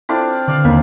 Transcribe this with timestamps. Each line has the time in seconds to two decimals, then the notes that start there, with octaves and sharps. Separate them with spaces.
0.09 C4 D4 E4 F4 A4 E5
0.48 D3 D5 F5
0.64 D#2 C4 D4 A#4